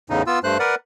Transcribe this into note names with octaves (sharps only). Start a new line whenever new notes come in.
E2 A2 C#3 D#4
B3 F4 E6
G2 A3 C5 F#6
A#4 B4 D5 F#5